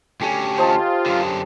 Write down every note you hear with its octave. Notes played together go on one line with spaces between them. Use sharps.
D2 C#4 G4 A4 G#5
F4 C5 D#5 A5
F#2 D3